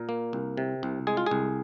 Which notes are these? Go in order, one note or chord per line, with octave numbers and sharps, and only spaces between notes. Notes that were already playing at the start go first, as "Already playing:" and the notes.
Already playing: A#2 A#4
A#3
C2
C3
C2
G#3 G#4
F4
C2 G#4